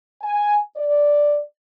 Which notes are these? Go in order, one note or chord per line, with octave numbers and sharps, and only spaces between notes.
G#5
D5